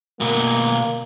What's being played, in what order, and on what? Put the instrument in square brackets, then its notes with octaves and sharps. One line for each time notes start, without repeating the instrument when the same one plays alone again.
[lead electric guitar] B2 A#4 [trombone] A#3